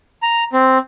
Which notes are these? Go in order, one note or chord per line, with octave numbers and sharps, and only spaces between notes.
A#5
C4